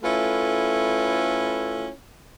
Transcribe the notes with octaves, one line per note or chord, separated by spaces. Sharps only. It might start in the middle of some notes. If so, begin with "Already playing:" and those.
A3 C#4 E4 F4 A4 B4